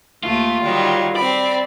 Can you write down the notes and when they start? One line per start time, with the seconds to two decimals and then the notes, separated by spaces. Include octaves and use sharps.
0.23 D#2 A3 F4
0.64 D#3 F#3 G3
1.16 C4 D5 B5